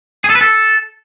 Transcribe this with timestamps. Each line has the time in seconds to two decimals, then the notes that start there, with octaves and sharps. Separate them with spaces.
0.24 G#4
0.30 A4
0.35 B4
0.41 A4